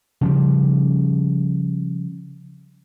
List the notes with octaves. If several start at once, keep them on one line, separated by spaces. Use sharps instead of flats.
C#3 F3 G3